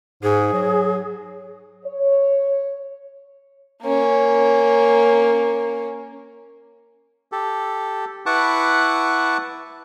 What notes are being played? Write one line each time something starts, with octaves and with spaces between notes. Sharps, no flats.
G#2 G#4
F#3
C#5
A#3 C#4
G4 A4
E4 B4 F#5 A5 C#6 D6